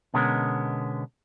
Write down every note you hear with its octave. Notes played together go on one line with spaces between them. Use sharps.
B2 D3 G#3 B3 C#4 A#4